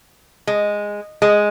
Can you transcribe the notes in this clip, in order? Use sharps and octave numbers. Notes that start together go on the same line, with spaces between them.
G#3
G#3